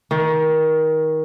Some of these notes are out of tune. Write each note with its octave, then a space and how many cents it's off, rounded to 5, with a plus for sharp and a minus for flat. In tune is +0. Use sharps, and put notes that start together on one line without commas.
D#3 +20